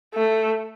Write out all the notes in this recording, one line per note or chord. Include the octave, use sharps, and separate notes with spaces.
A3